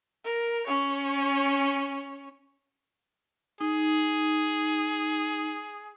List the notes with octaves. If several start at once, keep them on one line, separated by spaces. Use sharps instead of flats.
A#4
C#4 C#5
D#4 G#4